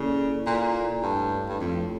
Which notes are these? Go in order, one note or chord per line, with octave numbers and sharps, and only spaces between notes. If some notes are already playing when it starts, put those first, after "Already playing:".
Already playing: C#3 A#3 E4 A4 D5
A#2 A#3 E4 A4 D5
G2 A3 E4 A4 C#5
G2
F2 A3 E4 A4 C#5